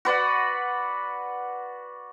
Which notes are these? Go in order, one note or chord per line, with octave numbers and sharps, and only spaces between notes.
F#4 B4 D5 F#5